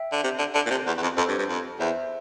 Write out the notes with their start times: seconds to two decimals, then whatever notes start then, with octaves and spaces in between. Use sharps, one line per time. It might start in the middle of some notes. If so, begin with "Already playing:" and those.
Already playing: E5 G5
0.13 D3
0.24 C3
0.39 D3
0.55 D3
0.66 A#2
0.70 C3
0.87 E2
0.98 E2
1.02 F2
1.17 F2 A4 C5
1.29 G2
1.39 G2
1.49 F2
1.80 E2 C5 E5